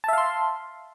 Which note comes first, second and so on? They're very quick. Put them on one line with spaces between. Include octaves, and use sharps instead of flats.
A5 E5 F5 C6